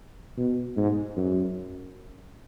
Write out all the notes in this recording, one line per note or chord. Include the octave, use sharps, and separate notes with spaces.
B2
G#2
F#2